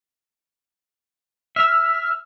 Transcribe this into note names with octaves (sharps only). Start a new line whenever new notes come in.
E5 E6 F6